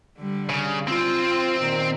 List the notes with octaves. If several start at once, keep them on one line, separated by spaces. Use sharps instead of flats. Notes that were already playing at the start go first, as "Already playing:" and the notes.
D3 G3
C#3
C4 F4
A#2 D#3